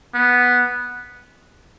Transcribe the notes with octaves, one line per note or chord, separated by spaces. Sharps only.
B3